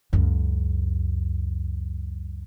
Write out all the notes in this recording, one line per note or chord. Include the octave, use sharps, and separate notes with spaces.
C#2 F#2